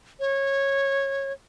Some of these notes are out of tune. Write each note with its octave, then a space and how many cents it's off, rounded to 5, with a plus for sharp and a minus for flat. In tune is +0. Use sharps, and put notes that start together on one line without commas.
C#5 -15